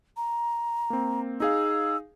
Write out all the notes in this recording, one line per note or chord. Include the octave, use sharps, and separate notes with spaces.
A#5
A#3 C4
D#4 G#4 F5 E6